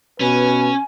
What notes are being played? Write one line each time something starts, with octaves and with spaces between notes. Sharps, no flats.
B2 C#4 B4 G#5